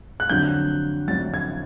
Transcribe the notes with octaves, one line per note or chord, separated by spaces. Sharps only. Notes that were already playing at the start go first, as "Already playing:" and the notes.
F#6
F2 D3 F#3 G6
F2 D3 F#3 A6
G#6